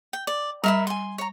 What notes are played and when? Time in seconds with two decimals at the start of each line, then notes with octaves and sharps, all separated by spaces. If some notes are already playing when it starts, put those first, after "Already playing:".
0.13 G5
0.27 D5
0.64 G3 A#4 E5 B5
0.87 G#5 C6
1.18 C#5 A#5